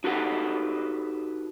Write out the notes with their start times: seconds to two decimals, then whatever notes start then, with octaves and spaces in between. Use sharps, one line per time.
0.04 D#4 F#4 G4 A4 B4 F#5